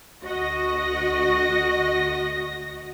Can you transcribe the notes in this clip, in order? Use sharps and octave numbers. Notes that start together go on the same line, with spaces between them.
D2 F#4 D#5 A#6